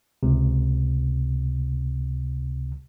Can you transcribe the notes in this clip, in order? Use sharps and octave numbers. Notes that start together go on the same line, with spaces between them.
C#2 C3